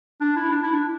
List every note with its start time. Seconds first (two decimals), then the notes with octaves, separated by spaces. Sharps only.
0.21 D4
0.36 E4
0.51 D4
0.64 E4
0.72 D4